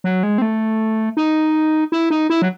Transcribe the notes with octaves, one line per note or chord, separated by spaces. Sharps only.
F#3
G#3
C4
A3
D#4
E4
D#4
E4
F#3